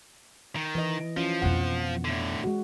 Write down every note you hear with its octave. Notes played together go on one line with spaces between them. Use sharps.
D#3
E3 E4 D#5
F3 C#4 E4 F4
F2 B2 F#5
A2 D3
G#3 F#4